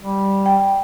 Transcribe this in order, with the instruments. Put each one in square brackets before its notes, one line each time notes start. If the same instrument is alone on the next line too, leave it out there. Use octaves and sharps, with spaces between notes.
[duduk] G3
[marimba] G5